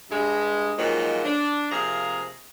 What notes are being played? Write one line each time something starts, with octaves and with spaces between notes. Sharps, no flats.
G2 G#3
A#2 D#3 F3 F#3 G#3
D4
C3 F3 A#3 G#4 A#5